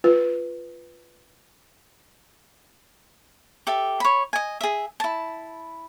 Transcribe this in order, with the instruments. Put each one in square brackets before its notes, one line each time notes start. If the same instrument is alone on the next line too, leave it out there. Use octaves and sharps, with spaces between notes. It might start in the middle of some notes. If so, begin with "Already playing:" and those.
[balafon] F4 B4
[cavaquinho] G4 A4 E5
C#5 B5
D#5 G#5
G#4 E5
E4 A5